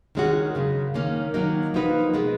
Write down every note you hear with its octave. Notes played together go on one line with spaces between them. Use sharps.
D#3 G#3 C#4 F#4
F#2 C#3 G#3
D#3 A#3 C#4
D#3 F#3 A#3 D#4
F3 A#3 D#4 F#4 B4
B2 G#3 B3